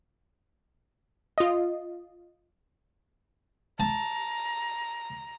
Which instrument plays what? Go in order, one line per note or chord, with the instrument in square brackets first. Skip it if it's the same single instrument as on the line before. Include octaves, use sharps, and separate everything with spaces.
[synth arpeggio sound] F4 D#5
[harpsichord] A5 [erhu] A#5